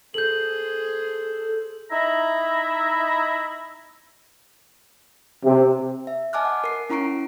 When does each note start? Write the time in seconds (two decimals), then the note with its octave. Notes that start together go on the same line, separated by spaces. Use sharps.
0.14 G#4 A4 C5 G6 F#7
1.91 D#4 E4 E5 A#5
5.45 C3
6.07 E5
6.33 D#5 G#5 A5 D6 F6 F#6
6.45 F#5
6.64 A#4 C7
6.90 C#4 E4 A#5 C#6 C7 D7